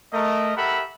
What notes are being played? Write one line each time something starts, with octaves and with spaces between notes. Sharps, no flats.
A3 A#4 D#5
G4 A4 A#4 E5 F#5 B5